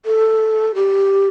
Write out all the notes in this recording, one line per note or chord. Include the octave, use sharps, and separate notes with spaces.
A4
G4